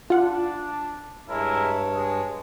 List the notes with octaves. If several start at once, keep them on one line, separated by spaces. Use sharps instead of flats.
D4 F4 F#5
G2 G#3 E4 A#4 C#5 A5
G#3